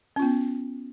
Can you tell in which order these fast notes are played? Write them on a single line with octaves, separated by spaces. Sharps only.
C#4 F4 B3